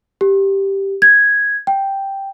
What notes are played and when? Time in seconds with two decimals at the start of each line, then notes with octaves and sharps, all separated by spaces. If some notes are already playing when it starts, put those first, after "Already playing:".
0.21 G4
1.02 G#6
1.67 G5